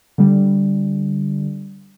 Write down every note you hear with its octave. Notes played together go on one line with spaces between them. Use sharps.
D3 G3